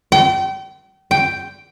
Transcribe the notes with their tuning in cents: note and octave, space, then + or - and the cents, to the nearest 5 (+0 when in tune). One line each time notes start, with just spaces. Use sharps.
G5 -35
G5 +0